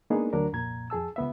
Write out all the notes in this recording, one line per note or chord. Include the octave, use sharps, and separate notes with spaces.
G#3 A#3 B3 D4 D#4 G#4
D2 F#3 D4 A#4
C2 F2 A#2 A#5 G#6
F2 G#4 A5 E6
C#2 B3 E5